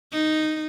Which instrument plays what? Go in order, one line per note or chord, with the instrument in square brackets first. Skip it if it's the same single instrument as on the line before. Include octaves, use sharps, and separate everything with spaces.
[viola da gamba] D#4